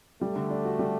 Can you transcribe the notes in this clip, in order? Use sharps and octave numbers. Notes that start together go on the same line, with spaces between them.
G3 A3
D3
D4
F#4
G3